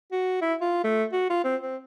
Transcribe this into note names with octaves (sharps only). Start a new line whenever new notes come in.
F#4
E4
F4
A3
F#4
F4
C4
C4